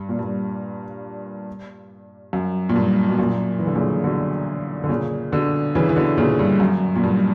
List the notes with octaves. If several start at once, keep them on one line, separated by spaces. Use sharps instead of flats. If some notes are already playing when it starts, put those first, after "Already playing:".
Already playing: G2
A#2
G2
F#2
A#2
G2
B2
F#2 A#2
E3
D3
A#2 C#3
B2 D3
D3
A#2 C#3
B2 D3
C#3 E3
E3
B2 D3
A#2 C#3
G2
F#2
A#2
G2